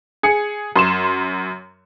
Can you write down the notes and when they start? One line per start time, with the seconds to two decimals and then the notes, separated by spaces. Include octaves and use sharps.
0.23 G#4 C#7
0.76 F#2 C6 E7